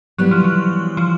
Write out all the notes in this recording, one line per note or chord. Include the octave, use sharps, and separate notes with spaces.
E3 F#3 G3 B3
F3
F#3
F3